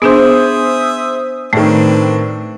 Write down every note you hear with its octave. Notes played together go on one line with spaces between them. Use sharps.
B3 D4 G#4 C5 E5 D#6
A2 D#3 A3 C4 D4 B4